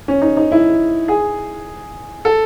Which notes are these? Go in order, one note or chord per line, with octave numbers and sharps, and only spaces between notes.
C#4
D#4
D#4
E4
G#4
A4